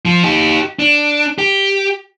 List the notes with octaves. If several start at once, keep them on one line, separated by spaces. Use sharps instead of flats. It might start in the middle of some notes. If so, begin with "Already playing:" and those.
F3
D#4 G4
D4
G4